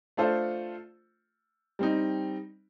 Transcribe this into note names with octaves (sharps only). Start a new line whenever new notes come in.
A3 D4 F4 A4 C5
G3 C4 D#4